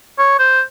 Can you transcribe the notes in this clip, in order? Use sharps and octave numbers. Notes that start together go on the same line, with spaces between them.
C#5
C5